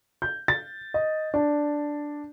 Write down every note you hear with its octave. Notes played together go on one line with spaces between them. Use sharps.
G6
A6
D#5
D4